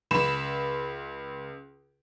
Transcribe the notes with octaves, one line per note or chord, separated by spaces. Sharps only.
C#2 B5 E7